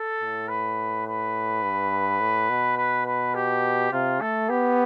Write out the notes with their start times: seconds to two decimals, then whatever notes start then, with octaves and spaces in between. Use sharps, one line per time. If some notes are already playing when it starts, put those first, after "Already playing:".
Already playing: A4
0.20 A2
0.49 B4
1.06 B4
1.63 G2
2.20 A2
2.49 B2
2.77 B4
3.06 B4
3.35 G4
3.92 C3 F4
4.21 A3 A4
4.49 B3 G4